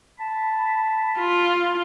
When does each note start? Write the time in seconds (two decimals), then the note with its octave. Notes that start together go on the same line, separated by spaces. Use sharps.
0.20 A5 B5
1.19 F4